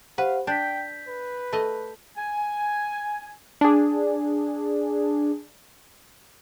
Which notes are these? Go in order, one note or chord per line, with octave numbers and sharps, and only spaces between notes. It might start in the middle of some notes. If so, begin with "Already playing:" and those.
G4 B4 C5 F5 F#5
D4 G5 G6 B6
B4
A3 D#5
G#5
D4 G#4